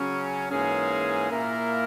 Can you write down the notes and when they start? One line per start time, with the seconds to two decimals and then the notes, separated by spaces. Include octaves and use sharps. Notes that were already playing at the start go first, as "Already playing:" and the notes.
Already playing: C#3 F#3 C#4
0.50 G#2 E3 A#3 C#4 G#4
1.31 A#2 A#3 E4 A#4